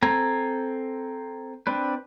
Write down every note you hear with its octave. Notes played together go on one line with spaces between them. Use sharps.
C4 A4 G#5 A#5
C4 D4 B4